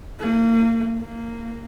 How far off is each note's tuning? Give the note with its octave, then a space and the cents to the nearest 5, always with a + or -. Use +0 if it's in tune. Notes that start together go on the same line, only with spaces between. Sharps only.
A#3 -30
A#3 -15